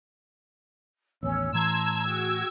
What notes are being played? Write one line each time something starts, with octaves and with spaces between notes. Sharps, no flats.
A1 D#2 B3 C#4 C#5 E6
A2 E3 A5 A#5 C6 E6 G#6
F#4 G#4 G5